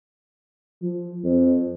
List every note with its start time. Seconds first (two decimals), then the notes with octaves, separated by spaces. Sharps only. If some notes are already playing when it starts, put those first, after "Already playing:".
0.82 F3
1.24 F2